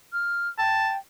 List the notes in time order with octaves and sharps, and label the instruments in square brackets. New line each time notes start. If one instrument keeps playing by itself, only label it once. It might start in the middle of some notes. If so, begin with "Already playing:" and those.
[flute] F6
[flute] G5 [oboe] A5